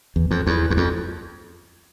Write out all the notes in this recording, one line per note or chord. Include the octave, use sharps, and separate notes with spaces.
E2
F2
E2
E2
F2